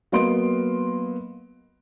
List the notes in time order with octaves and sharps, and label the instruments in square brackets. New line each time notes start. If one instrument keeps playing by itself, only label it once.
[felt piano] F#3 A#3 B3 D#5 C6 D7